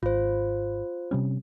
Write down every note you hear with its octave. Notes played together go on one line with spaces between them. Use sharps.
G#1 F4 C5
C3 G3 C#4